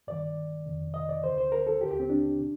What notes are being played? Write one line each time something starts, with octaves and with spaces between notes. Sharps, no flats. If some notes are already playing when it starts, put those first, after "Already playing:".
G2 D#3 D5
F2 C3 D#3
D#5
D5
D2 D3 C5
C5
A#4
A4
D#2 D3 G4
G4
C4
D4
C3